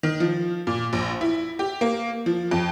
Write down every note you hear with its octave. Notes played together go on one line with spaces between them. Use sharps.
D#3
F3
A#2
A#1
E4
G4
A#3
F3
F2